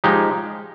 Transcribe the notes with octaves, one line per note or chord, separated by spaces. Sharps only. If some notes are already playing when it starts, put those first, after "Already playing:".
F3 G#3 D#4 G4